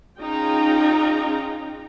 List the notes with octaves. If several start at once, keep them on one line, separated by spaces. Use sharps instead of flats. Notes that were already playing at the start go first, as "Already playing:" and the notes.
C#4 D#4 F4 G#4 G5 A#5